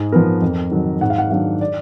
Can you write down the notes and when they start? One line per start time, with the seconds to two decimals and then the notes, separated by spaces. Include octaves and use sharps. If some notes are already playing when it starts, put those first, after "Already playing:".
Already playing: G#2 G#4
0.12 F3 B3 A#4
0.42 F2
0.71 D#3 F#3
1.01 G#2 F#5
1.10 F5
1.18 F#5
1.30 D#3 F#3 D4 F5
1.61 D5